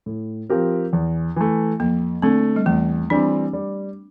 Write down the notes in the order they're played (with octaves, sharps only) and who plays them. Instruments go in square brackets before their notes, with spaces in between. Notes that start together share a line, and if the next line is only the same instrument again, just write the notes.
[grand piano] A2
F3 C4 G4 A#4
E2
E3 A3
[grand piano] F2 [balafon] A#3
[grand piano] D3 A3 [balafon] C4
[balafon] G3
[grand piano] E2 [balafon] A3
[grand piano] E3 G3 C4 [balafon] D4
[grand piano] G3